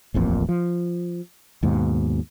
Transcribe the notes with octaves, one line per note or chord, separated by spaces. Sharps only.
D#1 A1 F2 A#2
F3
D#2 G#2 B2